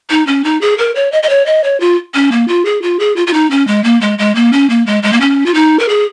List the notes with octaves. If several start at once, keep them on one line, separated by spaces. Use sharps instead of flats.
D#4
C#4
D#4
G#4
A#4
C#5
D#5
D#5
C#5
D#5
C#5
F4
C#4
A#3
F4
G#4
F4
G#4
F4
F4
D#4
C#4
G#3
A#3
G#3
G#3
A#3
C#4
A#3
G#3
G#3
A#3
C#4
F4
D#4
A#4
G#4